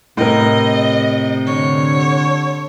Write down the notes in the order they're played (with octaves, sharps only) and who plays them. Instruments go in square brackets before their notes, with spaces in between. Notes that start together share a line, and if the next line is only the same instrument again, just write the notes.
[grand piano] A2 A#4 [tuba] C3 [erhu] D#5
[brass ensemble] D3 [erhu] C#5